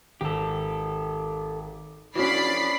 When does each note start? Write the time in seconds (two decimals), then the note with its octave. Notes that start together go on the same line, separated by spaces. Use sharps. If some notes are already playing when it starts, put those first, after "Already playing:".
0.21 G#1 G4 A4
2.16 E3 F3 C#4 D4 F#4 D5 B5 C7